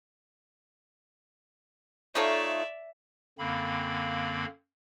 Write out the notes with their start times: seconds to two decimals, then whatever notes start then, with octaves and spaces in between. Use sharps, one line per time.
2.15 A3 D#4 F4 A4 C#5 D5 E5
3.39 F#2 D3 A#3 C4 F5 B5